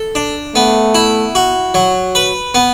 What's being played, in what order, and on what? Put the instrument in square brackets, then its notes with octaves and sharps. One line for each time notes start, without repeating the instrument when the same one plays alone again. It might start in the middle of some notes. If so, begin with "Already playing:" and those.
Already playing: [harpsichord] A4
D4
[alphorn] A3 [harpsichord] B3
[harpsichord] E4
F#4
F#3
B4
B3